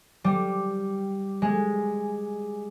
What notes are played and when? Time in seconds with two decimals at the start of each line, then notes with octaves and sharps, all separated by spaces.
0.24 G3
1.42 G#3